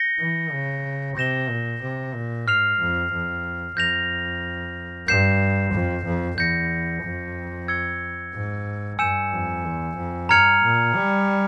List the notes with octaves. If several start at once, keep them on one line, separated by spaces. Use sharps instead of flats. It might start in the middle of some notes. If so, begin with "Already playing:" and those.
Already playing: G6 A#6 C#7 G7
E3
C#3
C3 G6 A#6 E7 G7
A#2
C3
A#2
G#2 F6 C7 F7
F2
F2
F2 G6 A#6 F7
G2 G6 C7 E7
F2
F2
E2 G6 A#6 C#7
F2
E6 G#6 C#7 G7
G#2
G2 G#5 E6 G6 C#7 E7
F2
E2
F2
G2 A#5 F6 G#6 C#7 F7
A#2
G3